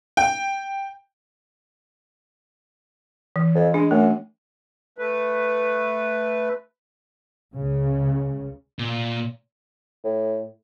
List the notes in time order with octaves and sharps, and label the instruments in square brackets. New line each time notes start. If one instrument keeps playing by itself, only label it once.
[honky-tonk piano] G5
[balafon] E3
[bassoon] F2
[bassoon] G#3 [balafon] D4
[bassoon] F#2 [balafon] A3
[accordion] A3 B4
[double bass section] C#2 C#3
[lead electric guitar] A#2
[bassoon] A2